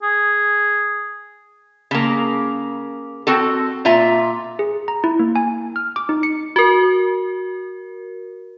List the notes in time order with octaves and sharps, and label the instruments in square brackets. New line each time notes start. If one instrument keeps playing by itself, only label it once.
[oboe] G#4
[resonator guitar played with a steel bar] C#3 A#3
C4 F#4 A4
A#2 F4 E5 A#5
[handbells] G#4
A#5
E4
A#3
G#5
F6
D6
D#4
C#7
[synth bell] F#4 A#4